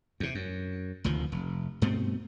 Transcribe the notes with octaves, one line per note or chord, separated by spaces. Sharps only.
E2 C3
F#2
F1 D2 D#3 F3
F1
G2 B2 A3 C4